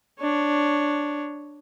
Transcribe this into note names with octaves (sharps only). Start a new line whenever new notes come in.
D4 C#5